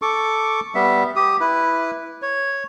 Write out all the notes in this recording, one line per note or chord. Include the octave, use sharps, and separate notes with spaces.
A4 C#6 D6
G3 B3 E5
G4 D#6
E4 B4
C#5